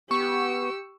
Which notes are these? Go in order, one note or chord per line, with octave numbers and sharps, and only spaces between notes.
B3 G4 C#6 E6 C#7